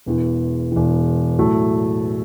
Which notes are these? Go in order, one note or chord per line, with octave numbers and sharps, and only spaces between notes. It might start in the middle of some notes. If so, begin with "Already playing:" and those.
E1 E2 E3
E1 E2 E3
A2 F#3 A3